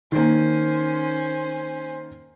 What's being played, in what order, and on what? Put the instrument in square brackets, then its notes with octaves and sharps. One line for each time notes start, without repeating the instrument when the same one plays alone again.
[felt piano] D#3 A#3 [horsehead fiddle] C#4 C5